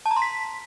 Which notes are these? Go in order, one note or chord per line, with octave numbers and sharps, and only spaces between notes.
A5
A#5
C6
B6